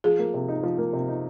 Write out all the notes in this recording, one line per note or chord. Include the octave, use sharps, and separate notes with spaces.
F3 G#4
A#3
C3
D#4
F3
A#3
C3
D#4